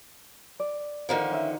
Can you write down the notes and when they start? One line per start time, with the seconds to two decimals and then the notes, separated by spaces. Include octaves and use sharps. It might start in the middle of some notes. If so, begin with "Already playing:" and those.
0.60 D5
1.09 D3 D#3 F3
1.31 C#4 E5